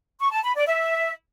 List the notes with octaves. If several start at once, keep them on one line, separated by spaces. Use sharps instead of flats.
C#6
A5
B5
D5
E5